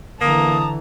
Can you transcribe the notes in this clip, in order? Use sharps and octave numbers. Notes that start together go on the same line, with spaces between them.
D3 E3 A#3 A5 A#5 D#6